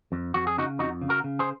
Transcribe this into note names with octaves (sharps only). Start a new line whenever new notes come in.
F2
F2 F#4
G#4
C#3 D#4 F#4
F2 D#4 F#4
C#3
F#4 A#4
C#3
G#4 C5